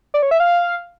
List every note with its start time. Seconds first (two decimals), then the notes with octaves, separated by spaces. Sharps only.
0.14 D5
0.23 C#5
0.31 E5
0.40 F5